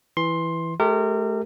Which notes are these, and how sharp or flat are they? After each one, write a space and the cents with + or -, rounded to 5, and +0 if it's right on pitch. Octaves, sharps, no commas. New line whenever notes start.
E3 +0 C6 +15
A3 -35 G4 +5 A#4 -30